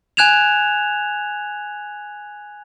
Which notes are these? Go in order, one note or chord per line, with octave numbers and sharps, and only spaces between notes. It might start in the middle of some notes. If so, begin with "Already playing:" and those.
G#5 F#6 G#6 E7 F7